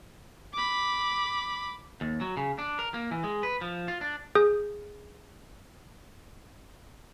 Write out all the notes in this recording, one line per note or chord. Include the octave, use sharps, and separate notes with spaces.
B5 D6
D#2
F#3
C#3
D4
A#4
A#3
E3
G#3
B4
F3
F4
D4
G#4 D#6 G6